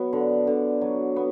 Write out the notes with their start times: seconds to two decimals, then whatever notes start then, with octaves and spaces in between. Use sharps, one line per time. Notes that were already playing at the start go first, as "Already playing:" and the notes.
Already playing: F#3 B3
0.13 D3
0.47 D3
0.81 F#3
1.16 B3